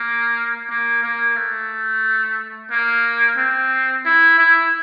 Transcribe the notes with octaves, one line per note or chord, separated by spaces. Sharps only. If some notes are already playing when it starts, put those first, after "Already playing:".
Already playing: A#3
A#3
A#3
A3
A#3
C4
E4
E4